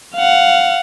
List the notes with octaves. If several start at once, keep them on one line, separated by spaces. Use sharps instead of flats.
F5 F#5